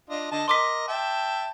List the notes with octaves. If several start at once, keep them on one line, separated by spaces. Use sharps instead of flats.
D4 F4 D#5
D3 D#5 A5
A#4 D#5 C6 D6 B6
E5 G5 A5